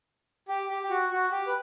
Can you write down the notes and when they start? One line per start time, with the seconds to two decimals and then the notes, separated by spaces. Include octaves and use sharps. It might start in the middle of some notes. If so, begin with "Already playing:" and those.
0.48 G4
0.69 G4
0.82 G4
0.90 F#4
1.11 F#4
1.31 G4
1.47 B4